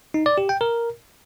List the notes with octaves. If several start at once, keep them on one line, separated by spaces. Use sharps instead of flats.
D#4
D5
G4
G5
A#4